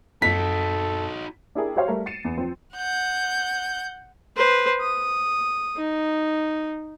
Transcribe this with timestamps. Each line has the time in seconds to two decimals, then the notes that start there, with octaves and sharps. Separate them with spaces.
0.22 F#2 C4 D#4 F#4 A4 B6
1.55 D4 E4 G4 G#4 A#4
1.76 F#4 G4 C5 C#5 F5
1.88 G3 A3 A#4
2.06 A6 C7 C#7 D#7 E7
2.25 E2
2.38 F3 C4
2.75 F#5 G6
4.37 B4 C5
4.81 D#6
5.77 D#4